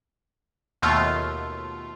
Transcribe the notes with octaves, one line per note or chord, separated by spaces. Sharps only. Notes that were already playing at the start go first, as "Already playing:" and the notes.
D#2 B2 A3 F4